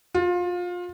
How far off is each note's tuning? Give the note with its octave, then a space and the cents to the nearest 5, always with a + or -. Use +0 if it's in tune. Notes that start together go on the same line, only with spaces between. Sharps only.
F4 +25